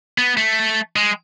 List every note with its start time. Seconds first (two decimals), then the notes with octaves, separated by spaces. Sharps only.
0.18 B3
0.37 A3
0.96 G#3